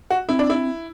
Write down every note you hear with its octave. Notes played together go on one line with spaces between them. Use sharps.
F#4
C4 E4
D4
E4